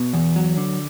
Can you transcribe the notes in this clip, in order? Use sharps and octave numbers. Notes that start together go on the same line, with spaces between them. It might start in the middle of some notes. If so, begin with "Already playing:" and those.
Already playing: B2
E2
F#3
D3